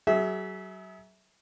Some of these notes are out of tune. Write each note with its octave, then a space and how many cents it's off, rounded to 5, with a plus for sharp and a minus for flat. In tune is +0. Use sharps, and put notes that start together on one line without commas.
F#3 +35 G#4 +30 E5 -15